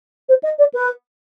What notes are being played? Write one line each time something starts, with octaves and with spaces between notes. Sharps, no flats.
C5
D#5
D5
B4